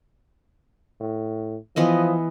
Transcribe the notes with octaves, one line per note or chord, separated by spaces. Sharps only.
A2
E3 F3 B3 D#5